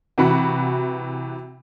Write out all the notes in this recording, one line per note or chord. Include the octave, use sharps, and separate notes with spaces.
C3 E3 F#4 F#5 B5